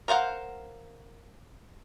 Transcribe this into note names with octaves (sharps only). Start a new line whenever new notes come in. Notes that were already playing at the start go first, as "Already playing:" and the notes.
A#4 C5 F5 F#5